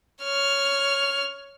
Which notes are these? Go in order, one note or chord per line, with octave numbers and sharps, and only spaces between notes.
C#5 F6